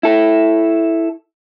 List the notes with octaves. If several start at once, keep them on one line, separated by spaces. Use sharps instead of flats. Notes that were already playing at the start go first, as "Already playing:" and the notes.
E4 A4